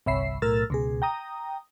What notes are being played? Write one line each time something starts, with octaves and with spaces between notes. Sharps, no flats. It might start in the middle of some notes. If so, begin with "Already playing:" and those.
G1 C2 C#5 E5 B5 C7
B1 A2 A#4 E6 F6 A6
C#2 B2 G#4
G5 A#5 D#6